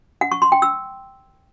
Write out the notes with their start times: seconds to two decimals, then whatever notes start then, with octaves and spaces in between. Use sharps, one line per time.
0.21 F#5
0.32 C#6
0.42 C6
0.52 G5
0.62 E6